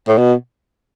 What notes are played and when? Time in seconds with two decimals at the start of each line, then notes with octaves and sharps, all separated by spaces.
0.08 A2
0.18 B2